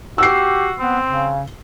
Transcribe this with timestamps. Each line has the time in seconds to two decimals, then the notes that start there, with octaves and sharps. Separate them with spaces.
0.18 F#4 G4 E6 C7
0.79 B3 C4
1.06 C#3